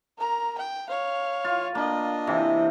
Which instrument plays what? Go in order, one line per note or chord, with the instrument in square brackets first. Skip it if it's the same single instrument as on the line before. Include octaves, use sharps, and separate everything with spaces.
[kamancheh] A#4 A#5
G5
C#5 F5
[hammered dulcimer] F4
[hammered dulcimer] A#3 [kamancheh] D4 D#5
[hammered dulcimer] C3 E3